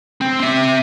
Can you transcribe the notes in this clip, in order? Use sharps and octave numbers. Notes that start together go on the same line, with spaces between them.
C4
C4 E5